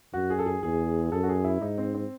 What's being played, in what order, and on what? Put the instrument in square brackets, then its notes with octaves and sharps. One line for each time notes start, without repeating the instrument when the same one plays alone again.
[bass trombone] F#2 [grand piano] F#4
[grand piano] G#4
A4
G#4
[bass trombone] E2 [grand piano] G#4
[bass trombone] F#2 [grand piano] A4
[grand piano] F#4
G#4
E4
[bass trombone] G#2 [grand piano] D#4
[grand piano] C4
C4